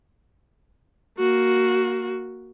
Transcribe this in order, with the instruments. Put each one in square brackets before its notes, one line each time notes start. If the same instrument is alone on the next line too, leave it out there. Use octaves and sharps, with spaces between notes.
[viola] A#3 F#4